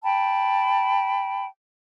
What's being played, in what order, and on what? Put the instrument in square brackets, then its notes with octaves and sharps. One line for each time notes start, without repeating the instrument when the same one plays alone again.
[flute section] G5 A5 B5